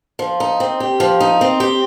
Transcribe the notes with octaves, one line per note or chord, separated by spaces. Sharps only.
F3
D#4
C4
G4
F3
D#4
C4
G4